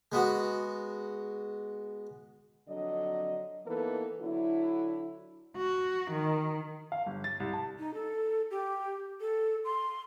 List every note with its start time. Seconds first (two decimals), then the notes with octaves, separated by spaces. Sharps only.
0.12 G#3 B3 F#4
2.68 F2 D3 F#3 D#5
3.66 E3 A#3 B3 D#4 A4 B4
4.21 D3 F#3 D4 E4
5.57 F#4
6.11 D#3
6.92 F5
7.06 G1
7.24 A6
7.40 C2
7.53 A5
7.79 D#4
7.94 A4
8.51 G4
9.21 A4
9.65 C6